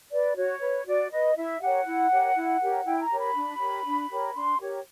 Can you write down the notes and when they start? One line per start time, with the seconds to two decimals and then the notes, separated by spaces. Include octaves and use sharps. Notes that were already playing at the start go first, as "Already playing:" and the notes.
0.11 B4 D5
0.36 F#4 C#5
0.61 B4
0.86 F#4 D5
1.10 B4 D#5
1.36 E4 E5
1.61 G4 A#4 C#5 F#5
1.86 E4
2.11 G4 A#4 C#5
2.36 E4
2.61 G4 A#4 C#5
2.86 E4 G5
3.02 A#5
3.10 G4 A#4 C#5
3.19 B5
3.35 D4
3.60 G4 A#4 C#5
3.86 D4
4.10 G4 A#4 C#5
4.35 D4 C6
4.60 G4 A#4 C#5